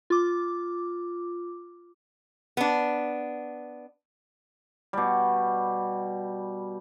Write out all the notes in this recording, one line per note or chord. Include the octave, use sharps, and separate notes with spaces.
F4 D6
B3 D4
B2 G3